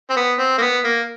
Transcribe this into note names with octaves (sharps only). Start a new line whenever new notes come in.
C4
B3
C4
A#3
B3
A#3